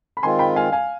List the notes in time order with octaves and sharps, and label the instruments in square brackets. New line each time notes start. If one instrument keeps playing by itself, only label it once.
[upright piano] B5
[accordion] D#3 G#3 C4 F4 [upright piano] G#5 C6
[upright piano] G5 B5
F5 G#5
F5 G#5